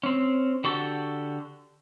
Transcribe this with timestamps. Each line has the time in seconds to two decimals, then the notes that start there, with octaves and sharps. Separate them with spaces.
0.03 C4 C#4
0.64 D3 F#4 G4 A4